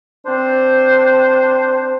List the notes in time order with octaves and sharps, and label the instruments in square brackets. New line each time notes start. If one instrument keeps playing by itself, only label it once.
[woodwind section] C4 D4 C5